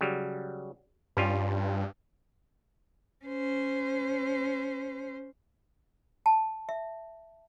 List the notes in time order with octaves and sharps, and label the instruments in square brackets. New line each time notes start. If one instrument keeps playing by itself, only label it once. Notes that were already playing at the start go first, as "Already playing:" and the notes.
[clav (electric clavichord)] C#3 F#3 G3
[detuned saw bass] G2 [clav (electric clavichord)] G3 C#4 F4
[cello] C#4 C5
[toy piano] A5
E5